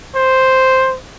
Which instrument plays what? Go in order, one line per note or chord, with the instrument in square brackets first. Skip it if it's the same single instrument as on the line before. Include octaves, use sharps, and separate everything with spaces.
[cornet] C5